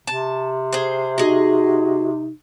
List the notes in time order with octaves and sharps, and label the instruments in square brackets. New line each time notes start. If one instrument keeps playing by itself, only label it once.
[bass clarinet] C3 [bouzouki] A5
[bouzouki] G#4 C5
[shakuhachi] D#4 [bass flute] F#4 [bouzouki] G#4 D#5